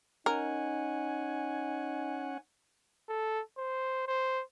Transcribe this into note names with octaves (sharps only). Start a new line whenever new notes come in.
C#4 D#4 A#4 F#5 G#5
A4
C5
C5